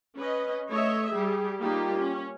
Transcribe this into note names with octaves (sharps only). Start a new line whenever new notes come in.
C#4 B4 D#5
A3 C#5 D#5 E5
G3 G4 G#4
G3 A#3 D#4 F4 G4
C#4